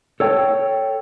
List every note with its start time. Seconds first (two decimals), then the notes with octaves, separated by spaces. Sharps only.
0.20 A4 C#5 G5